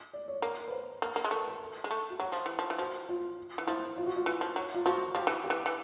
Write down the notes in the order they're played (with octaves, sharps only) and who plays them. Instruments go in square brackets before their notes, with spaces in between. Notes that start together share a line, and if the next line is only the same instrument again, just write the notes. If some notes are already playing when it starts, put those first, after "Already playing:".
[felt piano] D5
C#5
[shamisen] A#3
[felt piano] B4
C5
[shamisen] A#3
A#3
G#3
[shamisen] A3 [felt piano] A#4
[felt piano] B4
A#4
A4
[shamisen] G#3
A3
[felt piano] F#4
[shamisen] F#3 [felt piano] G4
[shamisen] F3
E3
F3
E3
[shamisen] F3 [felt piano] F#4
[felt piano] F4
[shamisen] E3
[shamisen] F3 [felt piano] E4
[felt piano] F4
F#4
F4
[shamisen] E3
F3
F#3
[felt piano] F4
[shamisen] F3 [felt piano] F#4
[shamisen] F3 [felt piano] G4
[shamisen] E3
[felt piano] G4
[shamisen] E3
E3